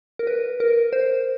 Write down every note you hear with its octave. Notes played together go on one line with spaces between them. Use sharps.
A#4
B4
A#4
C5